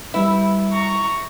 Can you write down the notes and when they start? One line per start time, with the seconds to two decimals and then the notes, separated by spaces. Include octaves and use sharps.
0.14 G3 E4 B4
0.71 A#5 C#6